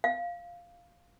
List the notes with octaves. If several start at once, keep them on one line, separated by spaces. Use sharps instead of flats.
F5